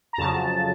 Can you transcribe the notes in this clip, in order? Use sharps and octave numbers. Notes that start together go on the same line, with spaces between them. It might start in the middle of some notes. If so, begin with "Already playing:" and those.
A#5
F2 C#3 F#3 A5